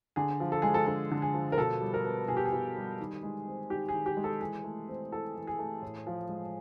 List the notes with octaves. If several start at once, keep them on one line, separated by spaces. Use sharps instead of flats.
D3 G#4
F3
A4
G#3 G#4
A4
D3 A4
D3
G#4
F3
A#4
B2 A4
G3
A#4
B3
B2 G#4
G4
G#4
B2
G3
D#3
G#3
C4
D#3 G4
D#3 G#4
G4
G#3
A4
E3 G#4
A3
C4
E3 A4
E3
G#4
A3
A2
F3
G#3